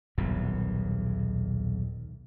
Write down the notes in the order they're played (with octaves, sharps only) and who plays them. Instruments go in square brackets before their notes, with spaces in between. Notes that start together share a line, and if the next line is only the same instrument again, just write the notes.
[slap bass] D#1 B1 E2